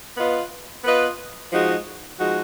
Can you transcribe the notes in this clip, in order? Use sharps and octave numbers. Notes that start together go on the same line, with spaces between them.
B3 F4 B4 D#5
B3 F4 B4 D#5
F3 G#3 D#4 F#4
F3 G#3 D#4 F#4